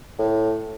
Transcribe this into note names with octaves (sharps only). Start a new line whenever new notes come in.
A2